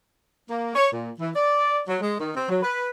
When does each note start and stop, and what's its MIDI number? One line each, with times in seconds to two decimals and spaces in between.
0.49 0.73 58
0.75 0.91 73
0.92 1.11 46
1.20 1.31 52
1.36 1.80 74
1.88 1.96 54
2.01 2.15 56
2.20 2.30 51
2.36 2.49 60
2.49 2.59 54
2.62 2.88 71